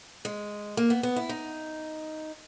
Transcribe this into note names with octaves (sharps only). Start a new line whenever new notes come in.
G#3
A#3
B3
B3
E4
D#4